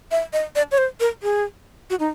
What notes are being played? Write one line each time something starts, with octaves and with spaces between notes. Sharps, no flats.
E5
D#5
D5
C#5
C5
A#4
G#4
F#4
D#4